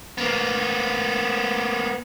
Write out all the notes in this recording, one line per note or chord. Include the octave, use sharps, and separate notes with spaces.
A#3 B3